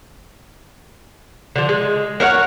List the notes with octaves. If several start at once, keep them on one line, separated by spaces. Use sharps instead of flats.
D3 F3
G#3
A#4 C#5 F5 F#5